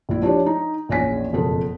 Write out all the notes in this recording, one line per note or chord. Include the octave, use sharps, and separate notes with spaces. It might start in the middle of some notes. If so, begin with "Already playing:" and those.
A#1 E4
F3 D4 G4 C#5
D#4
A#1 E2 C#4 C#5 G#5 B6
F#1 F2 B2 A4